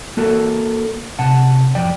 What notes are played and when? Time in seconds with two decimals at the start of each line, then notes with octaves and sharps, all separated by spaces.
0.17 A#3 F#4 A4 A#4
1.19 C3 F#5 A5
1.75 F2 D5 G5